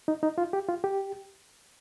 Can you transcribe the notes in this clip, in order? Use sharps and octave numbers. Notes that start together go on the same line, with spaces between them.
D#4
D#4
F4
G4
F4
G4